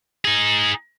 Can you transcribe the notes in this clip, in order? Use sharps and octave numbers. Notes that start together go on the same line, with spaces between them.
D#4 G#4